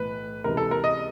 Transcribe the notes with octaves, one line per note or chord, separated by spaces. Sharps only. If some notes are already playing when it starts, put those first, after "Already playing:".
Already playing: B1 A2 E3 B4
C#2 C3 E3 A#4
A4
A#4
D#5